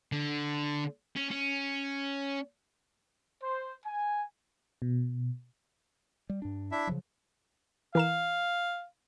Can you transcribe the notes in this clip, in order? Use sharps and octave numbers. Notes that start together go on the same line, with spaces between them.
D3
C#4
C#4
C5
G#5
B2
G3
G2 D4
D4 E4 E5
C#3 F3 F#3
E3 A#4 F5 E7